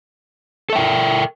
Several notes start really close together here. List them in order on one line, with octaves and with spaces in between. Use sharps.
A4 E5 G5 A#4